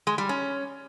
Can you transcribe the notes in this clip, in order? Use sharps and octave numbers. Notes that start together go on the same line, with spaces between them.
G#3
G3
C#4